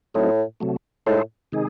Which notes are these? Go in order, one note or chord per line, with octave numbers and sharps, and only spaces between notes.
A2 F#3 A3 C4 D#4
C3 F#3 A3
A2 G#3 D#4 A4 C5
C3 D#3 G#3 D#4 G#4